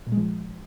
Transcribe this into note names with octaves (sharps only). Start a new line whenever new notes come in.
A#2
G#3
F3